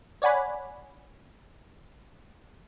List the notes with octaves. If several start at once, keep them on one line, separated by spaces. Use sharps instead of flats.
C#5 D5 F#5 G#5 B5